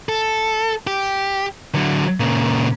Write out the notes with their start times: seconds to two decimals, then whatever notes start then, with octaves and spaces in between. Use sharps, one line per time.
0.09 A4
0.87 G4
1.75 D3 F#3
2.20 A#2 C#3